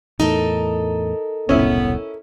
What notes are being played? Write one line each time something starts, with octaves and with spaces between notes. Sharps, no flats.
E2 A2 D#4 A4 A#4
E1 C2 A2 B3 C#4 E4